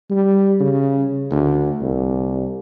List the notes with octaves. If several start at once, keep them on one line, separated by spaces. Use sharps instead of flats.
G3
C#3
D2
C2